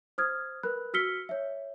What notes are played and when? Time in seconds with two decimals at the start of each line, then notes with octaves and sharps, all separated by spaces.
0.18 C5 D#6 F6 G#6
0.63 A#4 B4 B5 F#6
0.94 F#4 E6 F6 B6 C#7 G7
1.29 C#5 E5